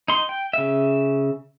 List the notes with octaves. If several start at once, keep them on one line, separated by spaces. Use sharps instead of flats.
D#4 C6
G5
C#3 E5